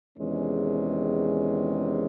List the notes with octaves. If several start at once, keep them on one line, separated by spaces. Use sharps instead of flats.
E2 C3 D#3 G#3 C#4